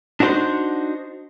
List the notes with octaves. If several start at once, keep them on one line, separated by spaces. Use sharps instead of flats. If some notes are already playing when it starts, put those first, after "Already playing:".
D4 D#4 F#4 B4 C5